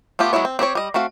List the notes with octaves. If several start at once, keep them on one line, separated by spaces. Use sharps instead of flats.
A3 B3 F4 G4
F#3 G#3 B3 E4 C#5
C4
C4 G4 C5 C#5
G3 D#5
A3 C4 F#4 F5